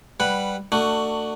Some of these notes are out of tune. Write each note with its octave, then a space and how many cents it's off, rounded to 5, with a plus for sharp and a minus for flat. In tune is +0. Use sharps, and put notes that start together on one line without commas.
G3 +0 B4 +0 F#5 +0
A3 +30 D4 +20 F#4 +5